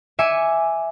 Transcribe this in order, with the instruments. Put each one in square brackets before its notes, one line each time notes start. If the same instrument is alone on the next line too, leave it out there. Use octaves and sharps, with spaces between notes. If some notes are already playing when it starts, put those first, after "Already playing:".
[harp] E5 G#5 D6 C#7 D#7